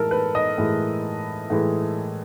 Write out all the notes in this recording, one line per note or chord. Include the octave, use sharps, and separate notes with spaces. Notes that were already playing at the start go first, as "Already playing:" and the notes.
Already playing: A2 E3 G#3 A4 A#4
B4
D#5
A2 E3 G#3
A2 E3 G#3